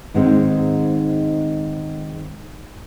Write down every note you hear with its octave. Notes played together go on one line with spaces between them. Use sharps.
G#2 D#3 G#3 C4 D#4